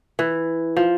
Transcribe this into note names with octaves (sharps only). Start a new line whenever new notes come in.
E3
F3